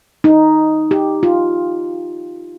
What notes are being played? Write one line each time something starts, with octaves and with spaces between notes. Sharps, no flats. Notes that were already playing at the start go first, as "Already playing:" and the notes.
D#4
G4
F4